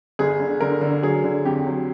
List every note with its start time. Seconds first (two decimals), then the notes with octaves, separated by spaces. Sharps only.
0.19 G1 G#4
0.40 D3
0.61 D3 A#4
0.81 D3
1.02 F#3 G#4
1.24 D3
1.45 F2 G4
1.66 F#3